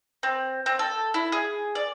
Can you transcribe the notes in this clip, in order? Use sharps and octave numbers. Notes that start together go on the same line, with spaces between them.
C4
C4
A4
E4
G#4
D5